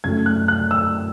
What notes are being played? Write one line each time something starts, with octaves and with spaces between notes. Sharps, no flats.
F#2 C#3 F#3 A3 G#6
F#6
F#6
E6